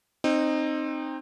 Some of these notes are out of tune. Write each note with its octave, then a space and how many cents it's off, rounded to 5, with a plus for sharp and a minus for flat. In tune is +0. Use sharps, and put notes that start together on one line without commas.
C4 +15 D#4 -15